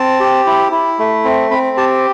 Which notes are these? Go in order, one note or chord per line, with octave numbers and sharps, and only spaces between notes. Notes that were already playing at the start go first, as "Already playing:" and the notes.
Already playing: C4 A5
G4
E4
E4
A3
C4
C4 B5
G4 A5